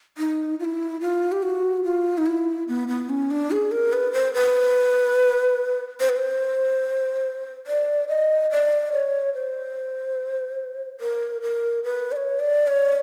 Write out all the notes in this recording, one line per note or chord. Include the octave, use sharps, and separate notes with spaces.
D#4
F4
E4
F4
G4
F#4
F4
D#4
E4
B3
B3
C#4
D4
G#4
A#4
B4
C5
B4
C5
B4
C5
D5
D#5
D5
C#5
C5
A#4
A#4
B4
D5
C#5
D5
C#5